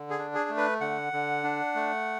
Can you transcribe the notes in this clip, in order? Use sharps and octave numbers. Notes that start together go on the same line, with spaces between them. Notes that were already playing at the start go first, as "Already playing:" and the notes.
Already playing: D3
G#4
D4
G#4
A3
B4
D3 F#5
D3
D4
A3